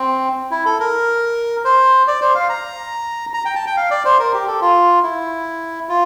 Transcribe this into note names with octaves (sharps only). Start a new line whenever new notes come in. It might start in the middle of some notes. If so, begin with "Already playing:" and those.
Already playing: C4
E4
A4
A#4
C5
D5
C5
F5
A#5
A#5
G5
A5
G5
F5
D5
C5
A#4
G4
A4
F4
E4
F4